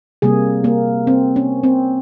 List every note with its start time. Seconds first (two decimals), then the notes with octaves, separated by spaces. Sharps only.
0.22 C3 G3 A#3 G#4
0.64 A#3
1.07 C4
1.36 C#4
1.64 C4